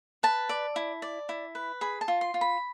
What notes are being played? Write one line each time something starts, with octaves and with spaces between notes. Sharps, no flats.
B4 A5
D5
E4
D5
E4
B4
G#4 B5
A5
F4
C6
F4
B5